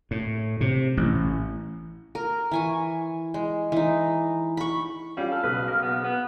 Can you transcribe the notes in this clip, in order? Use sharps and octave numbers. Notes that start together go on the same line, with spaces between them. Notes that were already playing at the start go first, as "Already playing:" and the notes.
A2
C3
A1
A#4
E3 G#5 C#6
G#3
E3 D#4
B5 C#6
G3 C#4 F4 F5
A4 F6
B1 C#3 B4 D#6
A#3
B3
B3